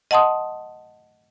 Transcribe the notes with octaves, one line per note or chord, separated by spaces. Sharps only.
D#5 F#5 A5 C6 D#6